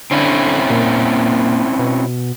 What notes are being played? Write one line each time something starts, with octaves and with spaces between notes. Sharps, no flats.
D3 C4 C#4 E4
A#2
B2